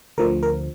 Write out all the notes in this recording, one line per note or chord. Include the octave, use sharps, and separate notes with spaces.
D2 D3 F3 A#4
A#4